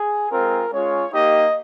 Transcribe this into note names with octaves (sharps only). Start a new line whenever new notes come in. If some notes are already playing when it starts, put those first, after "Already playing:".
Already playing: G#4
G#3 C4 F4 A#4
G#3 C#4 F4 C#5
A#3 D#4 G4 D#5